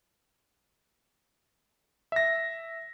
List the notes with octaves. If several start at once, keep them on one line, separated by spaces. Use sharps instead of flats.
E5 A#6